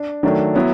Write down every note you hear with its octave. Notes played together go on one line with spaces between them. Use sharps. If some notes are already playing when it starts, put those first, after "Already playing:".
Already playing: D4
D#3 F#3 A3 D4
F#3 B3 E4